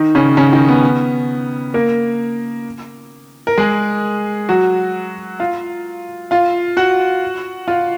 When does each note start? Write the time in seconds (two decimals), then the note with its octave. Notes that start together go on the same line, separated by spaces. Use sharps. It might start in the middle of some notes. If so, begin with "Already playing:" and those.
Already playing: D#3 D#4
0.15 C#3 C#4
0.37 C#3 C#4
0.53 D#3 D#4
0.69 B3
1.74 A#3 A#4
3.47 A#4
3.58 G#3 G#4
4.49 F#3 F#4
5.40 F4 F5
6.31 F4 F5
6.77 F#4 F#5
7.68 F4 F5